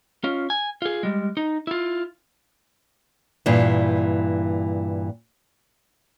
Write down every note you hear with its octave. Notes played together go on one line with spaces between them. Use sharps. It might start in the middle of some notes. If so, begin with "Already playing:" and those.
C#4 F4
G#5
F4 G#4
G3 G#3
D#4
E4 F4
G2 A#2 E3